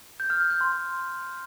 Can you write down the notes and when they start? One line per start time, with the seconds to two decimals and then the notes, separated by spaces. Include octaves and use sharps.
0.20 G6
0.30 F6
0.40 G6
0.50 G6
0.61 C6